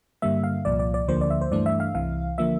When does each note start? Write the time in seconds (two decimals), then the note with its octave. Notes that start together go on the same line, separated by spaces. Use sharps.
0.22 G2 D3 G3 A#3 E5
0.44 F5
0.65 C2 A#2 F3 D5
0.79 D5
0.94 D5
1.08 D2 D3 F3 A#3 C5
1.21 D5
1.30 E5
1.41 C5
1.51 G2 E3 A3 D4 D5
1.66 E5
1.80 F5
1.95 C2 C3 E3 F5
2.38 D3 F3 A#3 E5